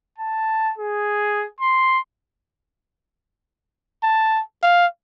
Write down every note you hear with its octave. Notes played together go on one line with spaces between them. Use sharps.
A5
G#4
C6
A5
F5